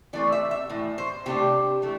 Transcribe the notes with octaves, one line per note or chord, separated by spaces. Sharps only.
E3 A3 C4 D5
E5
E5
A2 E3
C5
C3 A3 D4 G4
E3 A3